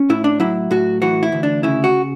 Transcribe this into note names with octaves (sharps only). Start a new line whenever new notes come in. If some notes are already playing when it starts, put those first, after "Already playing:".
Already playing: C#4
A2 E4
D4
F#3 E4
A2 F#4
E3 F#4
E4
D2
D4
C#3 E4
F#4